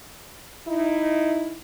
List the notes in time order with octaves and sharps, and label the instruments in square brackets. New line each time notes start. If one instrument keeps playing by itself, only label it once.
[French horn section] D#4 E4